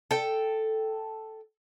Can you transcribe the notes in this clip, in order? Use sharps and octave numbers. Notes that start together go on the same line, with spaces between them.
A4 G5